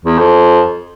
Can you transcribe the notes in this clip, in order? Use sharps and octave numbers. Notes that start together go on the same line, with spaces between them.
E2
F2